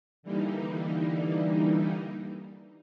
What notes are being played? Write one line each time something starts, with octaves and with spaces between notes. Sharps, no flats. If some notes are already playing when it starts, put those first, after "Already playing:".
D3 E3 G3 A#3 D#4